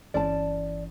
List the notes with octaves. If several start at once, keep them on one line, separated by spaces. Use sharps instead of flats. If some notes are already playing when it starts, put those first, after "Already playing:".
G1 E3 C#4 D5 A5